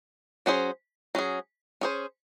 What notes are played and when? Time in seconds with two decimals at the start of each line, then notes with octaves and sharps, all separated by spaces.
0.46 F#3 C#4 G#4 C5
1.15 F#3 C#4 G#4
1.81 C#4 G#4 C5